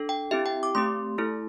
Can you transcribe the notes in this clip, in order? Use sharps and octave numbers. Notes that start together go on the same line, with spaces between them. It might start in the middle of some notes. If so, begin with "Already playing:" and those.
Already playing: D4 A4
G5
C4 E4 G4 E5
G5
D6
A3 C4 G4 C6
A3 E4 A4